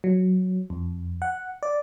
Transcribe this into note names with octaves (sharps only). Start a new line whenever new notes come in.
F#3
F2
F#5
D5